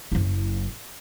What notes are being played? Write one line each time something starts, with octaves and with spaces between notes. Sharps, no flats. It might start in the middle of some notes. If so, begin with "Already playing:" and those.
F#1 E4